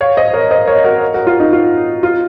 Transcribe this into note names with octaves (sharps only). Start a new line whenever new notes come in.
C#5 F5
C5 D#5
A#4 C#5
C5 D#5
A#4 C#5
F#4 A#4
F#4 A#4
F4
D#4
F4
F4